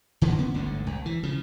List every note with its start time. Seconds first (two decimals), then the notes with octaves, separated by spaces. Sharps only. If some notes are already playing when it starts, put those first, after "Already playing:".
0.22 F#2 D3 D#3 F3
0.39 D3 B3 C#4
0.54 G1 D2 G#2 D3
0.87 C2
1.06 E3
1.23 C#3 F3